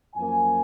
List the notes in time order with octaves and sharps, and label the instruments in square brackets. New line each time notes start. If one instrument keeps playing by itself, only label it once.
[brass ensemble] F#2 F3 A#3 G#5